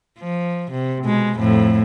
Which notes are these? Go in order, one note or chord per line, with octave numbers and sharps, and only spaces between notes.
F3
C3
B2 G#3
F2 A2